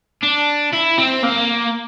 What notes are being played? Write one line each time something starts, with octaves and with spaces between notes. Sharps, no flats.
D4
E4
C4
A#3